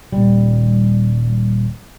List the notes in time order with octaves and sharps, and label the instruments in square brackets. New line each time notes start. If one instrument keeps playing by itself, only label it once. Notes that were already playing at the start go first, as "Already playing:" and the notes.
[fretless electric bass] D#1 G3